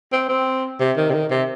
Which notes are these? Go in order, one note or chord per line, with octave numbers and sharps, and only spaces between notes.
C4
C4
C3
D#3
C3
D#3
C3